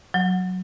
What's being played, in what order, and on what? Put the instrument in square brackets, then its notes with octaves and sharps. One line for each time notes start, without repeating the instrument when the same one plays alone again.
[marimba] F#3